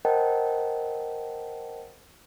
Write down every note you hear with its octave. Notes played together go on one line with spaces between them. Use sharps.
A#4 C5 D#5 F#5 G5 A5